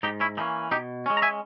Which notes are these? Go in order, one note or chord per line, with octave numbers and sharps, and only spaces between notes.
G#2 D#4 G4
C#4 E4
E3 A#3 C#4 D#4
B2 D#4 G4
G#3 C#4
A#5
E5 G#5